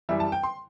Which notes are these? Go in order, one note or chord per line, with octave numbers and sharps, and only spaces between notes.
F#2 E3 G3 E5
A5
G5
C6